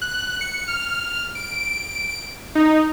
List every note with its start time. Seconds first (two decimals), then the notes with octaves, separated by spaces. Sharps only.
0.02 F#6
0.41 C#7
0.68 F6
1.35 D7
2.55 D#4